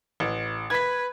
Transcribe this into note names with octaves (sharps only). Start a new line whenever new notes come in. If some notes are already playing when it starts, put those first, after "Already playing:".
A1
B4 G#6 B6